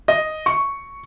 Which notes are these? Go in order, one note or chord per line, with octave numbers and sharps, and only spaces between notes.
D#5
C#6